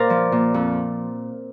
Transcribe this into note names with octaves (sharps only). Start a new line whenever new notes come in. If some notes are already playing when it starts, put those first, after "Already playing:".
Already playing: A#2 A#4 C5 D5 F5
F3
A#2
F2